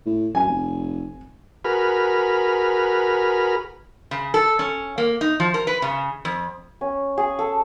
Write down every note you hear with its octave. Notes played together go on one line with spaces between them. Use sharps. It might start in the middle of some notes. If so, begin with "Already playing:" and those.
A2
F#2 G#5
F1
F#4 G#4 A#4 B4 B5 F6
C#3
A4
C#4
A#3
D#4
F3
A#4
B4
C#3
F2
C#4
G#4
A4